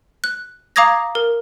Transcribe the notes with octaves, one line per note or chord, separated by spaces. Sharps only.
F#6
F5 A#5 D6 D#6 G#6 A#6
A#4